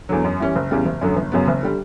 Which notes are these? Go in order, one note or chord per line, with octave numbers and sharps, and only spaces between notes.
E2 D3 F#3
F#2
E3 G3 C#4
F#1
E2 C#3 G3
F#1
F#2 D3 F#3 A3
G1
F#2 C#3 F#3 B3
F#1
D3 G3